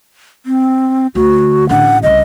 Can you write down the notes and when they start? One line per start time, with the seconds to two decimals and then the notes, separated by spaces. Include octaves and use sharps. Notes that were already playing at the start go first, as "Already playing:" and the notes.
0.46 C4
1.15 D2 F#4
1.69 A1 D3 F#5
2.03 C2 C#3 D#5